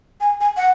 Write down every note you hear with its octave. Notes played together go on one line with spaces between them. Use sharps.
G#5
G#5
F#5